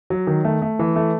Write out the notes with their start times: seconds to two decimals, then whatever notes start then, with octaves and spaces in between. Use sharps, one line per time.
0.10 F#3
0.27 D#3
0.44 A3
0.62 A3
0.79 E3
0.96 A3